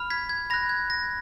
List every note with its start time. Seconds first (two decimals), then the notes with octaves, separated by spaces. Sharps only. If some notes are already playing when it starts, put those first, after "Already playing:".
Already playing: B5 F6
0.10 G#6 B6
0.29 G#6
0.50 B5 F#6 A#6
0.69 G#6
0.90 A#6